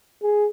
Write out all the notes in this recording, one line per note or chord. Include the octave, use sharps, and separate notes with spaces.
G#4